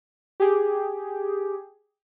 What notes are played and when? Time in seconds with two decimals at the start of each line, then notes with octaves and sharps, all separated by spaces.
0.40 G4 G#4